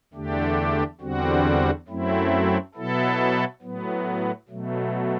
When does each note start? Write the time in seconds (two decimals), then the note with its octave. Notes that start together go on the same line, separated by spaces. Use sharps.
0.13 E2 D3 A3 D4 G4
1.01 E2 D3 G3 C4 F#4
1.88 F#2 F#3 A3 C4 E4
2.75 B2 F#3 B3 E4 A4
3.62 A2 F#3 B3
4.49 B2 F#3 A3